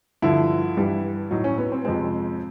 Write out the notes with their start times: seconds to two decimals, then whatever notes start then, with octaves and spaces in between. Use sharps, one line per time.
0.22 G2 D3 F3 E4
0.77 G2 E3 G3
1.31 A2 F#3 D#4
1.44 C#4
1.58 B3
1.72 C4
1.85 F2 C3 F3 G#3 C4